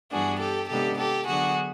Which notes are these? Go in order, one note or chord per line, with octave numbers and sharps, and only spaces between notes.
G2 E3 G3 B3 D4 F#4 G#4
G4 A4
C3 D#3 G#3 B3 D4 G4 A4
G4 A4
D3 F#3 B3 D4 F#4 G#4